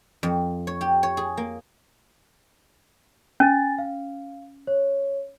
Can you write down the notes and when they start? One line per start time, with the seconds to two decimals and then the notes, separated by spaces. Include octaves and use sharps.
0.23 F2
0.67 C#5
0.81 G4
1.03 C#5
1.17 G#4
1.37 A#3
3.40 C#4 G#5 A6
3.78 F5
4.67 C#5